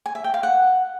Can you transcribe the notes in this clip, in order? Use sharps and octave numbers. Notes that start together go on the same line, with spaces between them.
G#5
E5
G5
F5
F#5